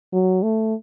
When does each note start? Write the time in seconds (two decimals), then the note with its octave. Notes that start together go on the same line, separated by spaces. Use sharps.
0.13 F#3
0.43 A3